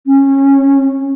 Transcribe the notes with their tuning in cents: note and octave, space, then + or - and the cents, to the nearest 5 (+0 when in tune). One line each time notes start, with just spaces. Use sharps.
C#4 -20